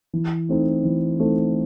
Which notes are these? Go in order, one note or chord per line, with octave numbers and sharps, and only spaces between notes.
E3
A3 C4 D#4
E3
A3 C4 D#4